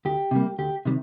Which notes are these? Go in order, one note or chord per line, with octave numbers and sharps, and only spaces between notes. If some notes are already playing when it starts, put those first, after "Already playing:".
D2 G4
C3 D#3 G3 A#3
D2 G4
C3 D#3 G3